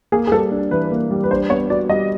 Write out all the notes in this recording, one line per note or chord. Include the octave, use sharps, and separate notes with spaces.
A#3 G#4
G#4
G3 A4
D4
E3 B4
A#3
G3
B4
D4 C5
B3 C#5
F#4 D5
G3 D#5